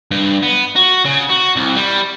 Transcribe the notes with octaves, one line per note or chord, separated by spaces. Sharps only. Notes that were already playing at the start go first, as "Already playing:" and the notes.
G2
B3
F#4
C#3
F#4
C2
G3